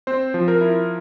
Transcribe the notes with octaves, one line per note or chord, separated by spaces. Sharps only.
C4 C5
F3
A#4
E4